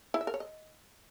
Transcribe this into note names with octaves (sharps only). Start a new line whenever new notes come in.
E4
E5
A#4
C#5
D#5